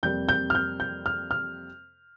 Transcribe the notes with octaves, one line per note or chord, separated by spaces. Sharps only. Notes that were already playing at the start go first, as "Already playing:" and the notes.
F2 C3 G3 A#3 G6
G6
F6
G6
G6
F6
F6